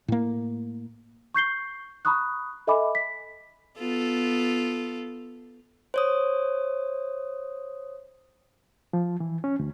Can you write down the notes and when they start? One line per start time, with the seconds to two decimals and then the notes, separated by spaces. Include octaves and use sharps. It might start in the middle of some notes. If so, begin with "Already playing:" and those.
0.08 A2 A#3
1.34 C#6 G6 C7 G7
2.05 A#5 B5 C#6 D#6 F#6
2.67 A4 D#5 E5 G#5 B5 D6
2.95 B6
3.79 B3 F4 A4
5.94 C5 C#5 D#6
8.93 F3
9.20 E3
9.44 C#4
9.59 D2